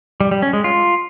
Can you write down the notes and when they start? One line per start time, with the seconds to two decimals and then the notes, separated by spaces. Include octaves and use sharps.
0.20 G3
0.31 G3
0.42 C#4
0.53 G#3
0.64 F4